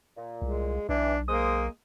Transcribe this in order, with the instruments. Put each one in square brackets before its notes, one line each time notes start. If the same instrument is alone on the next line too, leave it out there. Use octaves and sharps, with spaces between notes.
[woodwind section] A#2
[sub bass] C2 [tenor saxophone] G#3
[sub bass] B1 [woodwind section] E3 [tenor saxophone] D4
[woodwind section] G#3 C5 D#6 [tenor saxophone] A#3